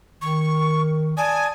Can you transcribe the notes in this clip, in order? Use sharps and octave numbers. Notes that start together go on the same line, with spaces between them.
D#3 C#6
D5 G#5 A5 D#6